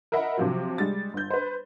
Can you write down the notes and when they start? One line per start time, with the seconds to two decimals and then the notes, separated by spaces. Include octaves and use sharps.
0.12 A#4 D#5 E5 F#5 B5
0.37 C3 F3 F#3
0.78 G3 G#3 A6
1.13 G1 G6
1.30 B4 C5